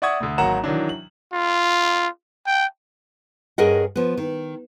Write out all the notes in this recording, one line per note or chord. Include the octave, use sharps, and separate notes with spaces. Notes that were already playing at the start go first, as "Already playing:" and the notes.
D5 E5 F#5 C#6 D#6 G#6
D2 D3
G#1 F#3 A#3 F#5 A#5 E7
D#3 E3 F#3 D4
F#7
F4
G5
G2 C#4 G#4 A#4 D#5 F#5
F3 B3
D#3